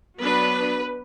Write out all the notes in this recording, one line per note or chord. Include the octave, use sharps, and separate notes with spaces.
F#3 B3 D4 B4